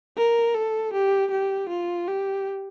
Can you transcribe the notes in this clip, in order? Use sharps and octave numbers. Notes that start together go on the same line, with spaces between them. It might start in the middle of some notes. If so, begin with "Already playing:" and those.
A#4
A4
G4
G4
F4
G4